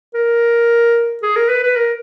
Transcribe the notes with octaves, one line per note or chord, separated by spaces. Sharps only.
A#4
G#4
A#4
B4
B4
A#4